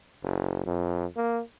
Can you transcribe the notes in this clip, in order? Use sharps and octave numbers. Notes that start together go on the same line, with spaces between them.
F#1
F2
A#3